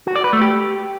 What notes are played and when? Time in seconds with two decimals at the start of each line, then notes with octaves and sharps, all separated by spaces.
0.07 F#4
0.16 D5
0.24 B4
0.33 A3
0.42 G4